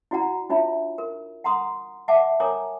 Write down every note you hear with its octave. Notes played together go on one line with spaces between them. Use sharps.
E4 F#4 D5 F#5 A#5
D4 D#4 F4 C#5 E5 B5
A#4
F#5 A#5 C6 D#6
E5 F#5 A5 D6
A#4 C#5 G#5 A#5 D6 D#6